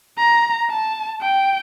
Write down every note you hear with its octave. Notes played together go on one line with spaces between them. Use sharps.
A#5
A5
G5